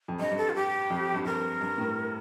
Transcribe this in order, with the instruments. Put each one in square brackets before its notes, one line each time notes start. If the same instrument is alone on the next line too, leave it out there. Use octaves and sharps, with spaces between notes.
[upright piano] F2
[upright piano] G2 [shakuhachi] D#5
[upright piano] G2
[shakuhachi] A4
F4
G4
[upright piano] F2
G2
[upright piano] F2 [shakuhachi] A#4
[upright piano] G2
A2